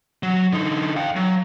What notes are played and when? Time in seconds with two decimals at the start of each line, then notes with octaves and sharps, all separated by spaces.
0.23 F#3
0.53 D3 D#4
0.96 F5 G5
1.16 F#3